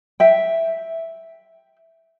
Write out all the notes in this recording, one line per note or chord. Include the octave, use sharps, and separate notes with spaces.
E5 G5